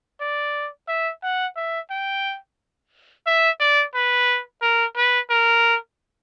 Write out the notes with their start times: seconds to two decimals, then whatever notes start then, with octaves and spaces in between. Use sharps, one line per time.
0.21 D5
0.88 E5
1.23 F#5
1.56 E5
1.90 G5
3.26 E5
3.60 D5
3.94 B4
4.62 A#4
4.96 B4
5.30 A#4